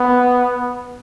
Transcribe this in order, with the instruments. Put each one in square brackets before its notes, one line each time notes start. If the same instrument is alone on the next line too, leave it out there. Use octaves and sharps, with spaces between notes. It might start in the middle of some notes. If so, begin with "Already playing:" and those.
Already playing: [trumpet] B3